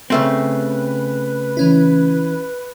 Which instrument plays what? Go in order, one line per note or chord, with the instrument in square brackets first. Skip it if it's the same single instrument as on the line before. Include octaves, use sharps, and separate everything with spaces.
[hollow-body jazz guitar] C#3 A3 C4 [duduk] B4
[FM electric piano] E3 C#4 E4